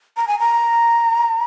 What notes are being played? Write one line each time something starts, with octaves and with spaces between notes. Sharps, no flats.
A#5
G#5
A#5